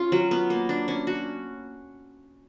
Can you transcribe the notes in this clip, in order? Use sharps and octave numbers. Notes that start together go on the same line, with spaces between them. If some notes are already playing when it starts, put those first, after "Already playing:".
Already playing: C#4 F4
F#3
B3
A#3
D4
C#4
F#4